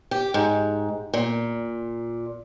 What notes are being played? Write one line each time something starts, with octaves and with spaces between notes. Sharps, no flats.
G4
G#2
A#2